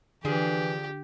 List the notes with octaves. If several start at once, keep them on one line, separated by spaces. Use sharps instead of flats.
D3 E3 F3 D4 G4 G#4